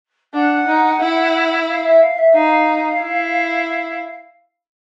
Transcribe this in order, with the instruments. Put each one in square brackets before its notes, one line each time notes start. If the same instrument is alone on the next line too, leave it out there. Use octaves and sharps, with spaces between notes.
[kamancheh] D4 [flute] F#5
[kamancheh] D#4
E4
[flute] F5
E5
F5
E5
[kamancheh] D#4 [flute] F5
[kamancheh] E4